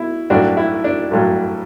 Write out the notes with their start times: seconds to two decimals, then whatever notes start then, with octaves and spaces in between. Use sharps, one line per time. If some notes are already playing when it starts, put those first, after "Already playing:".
Already playing: B2 E4
0.30 A1 G2 F#3 D4 F#4
0.57 E4
0.84 D4
1.11 A1 G2 F#3